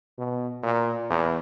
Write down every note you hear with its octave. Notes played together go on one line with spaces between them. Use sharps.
B2
A#2
E2